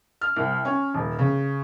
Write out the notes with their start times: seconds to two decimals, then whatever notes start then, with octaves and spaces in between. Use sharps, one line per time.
0.21 F6
0.36 C2
0.65 C#4
0.94 D#1
1.19 C#3